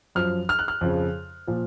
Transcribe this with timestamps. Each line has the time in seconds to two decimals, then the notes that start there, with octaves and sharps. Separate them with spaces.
0.15 F#2 F3 F6
0.49 F6
0.59 F#6
0.68 F6
0.81 F2 C#3 F3
1.48 A#2 F3